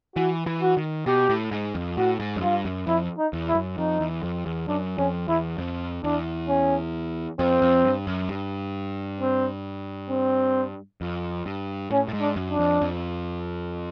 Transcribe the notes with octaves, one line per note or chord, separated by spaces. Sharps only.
E3 F#4
E3
F#4
D#3
B2 G4
A2
G#2
F2
A2 F#4
G#2
F#2
G2 F4
F#2
F2 E4
D#4
E2
E4
F#2
F2 D#4
E2
F2
E2
F#2 D4
F2 C#4
E2 E4
F2
E2 D4
C#4
F2 C4
F2
G2
F#2
G2
C4
C4
F2
G2
A2 C#4
A2
G#2
D4
F#2
D4
F2
F2